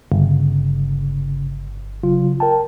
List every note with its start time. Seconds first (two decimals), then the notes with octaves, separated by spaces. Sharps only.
0.12 G1 C#3
2.03 C#3 F#3 F4
2.40 A#4 G5 A5